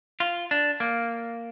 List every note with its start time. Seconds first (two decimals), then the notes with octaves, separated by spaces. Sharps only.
0.20 F4
0.51 D4
0.80 A#3